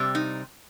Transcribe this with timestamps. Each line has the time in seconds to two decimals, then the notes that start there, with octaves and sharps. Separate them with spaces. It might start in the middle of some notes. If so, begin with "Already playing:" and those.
Already playing: C3 G3
0.15 D#4